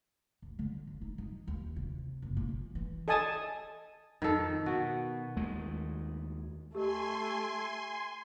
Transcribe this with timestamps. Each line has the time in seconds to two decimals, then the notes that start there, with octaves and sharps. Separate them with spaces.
0.42 D2
0.59 D3
0.87 F2
1.02 D#4
1.18 D#4
1.47 D#2
1.76 C3
2.22 F#1
2.37 A#2
2.48 E3
2.75 E3
3.08 A4 D#5 G#5 A5 D#6
4.22 F2 D#3 A4
4.66 B2 F#4
5.37 D#2 G#3 A3
6.75 A3 G4 A#4 D#5 G#5 C6